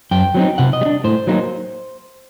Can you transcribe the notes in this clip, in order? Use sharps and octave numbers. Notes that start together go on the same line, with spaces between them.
F#2 G5
F#3 C4 D#4
C3 F#5
D#5
G3
D4
A2 C5
F#3 A#3 D#4